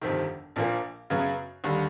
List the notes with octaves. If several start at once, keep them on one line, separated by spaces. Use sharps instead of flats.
G1 F2 C3 D#3
A#1 A#2 F3 A#3
F#2 C#3 F#3 B3
D#2 D3 G3